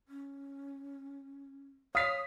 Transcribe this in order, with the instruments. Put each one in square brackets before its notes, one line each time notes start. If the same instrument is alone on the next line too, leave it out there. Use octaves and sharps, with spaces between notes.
[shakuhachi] C#4
[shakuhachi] C#5 [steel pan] F5 [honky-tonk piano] D#6 B6